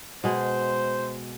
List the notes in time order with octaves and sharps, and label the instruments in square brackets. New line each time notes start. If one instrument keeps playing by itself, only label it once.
[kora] B2 G#3 [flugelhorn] C5